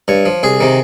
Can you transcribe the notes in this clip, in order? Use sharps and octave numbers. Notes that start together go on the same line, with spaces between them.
G2 C#5
F3
C2 G#4
C3 D#3